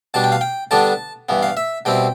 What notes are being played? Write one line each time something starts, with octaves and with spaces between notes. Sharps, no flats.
B2 G3 D4 A5
G5
F5
G5
D3 G3 B3 D4 A5
G2 E3 B3
F5
E5
B2 G3 C4 E4 G5